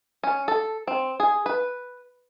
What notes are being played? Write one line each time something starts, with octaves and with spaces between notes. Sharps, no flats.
C#4
A4
C4
G#4
B4